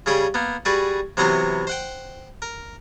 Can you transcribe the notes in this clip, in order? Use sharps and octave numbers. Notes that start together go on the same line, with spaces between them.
C#3 G3 G#4 G5 B5
A#3 B3
G3 F#4 G#4 B4 D5
C3 E3 F#3 B3 A#5 C6
C5 F#5 G5
A#4